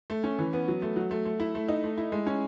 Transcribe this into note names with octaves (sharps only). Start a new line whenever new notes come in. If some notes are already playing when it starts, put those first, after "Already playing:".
A3
C#4
E3
B3
F#3
A3
F#3
A3
A3
E4
A3
D#4
A3
E4
G#3
C#4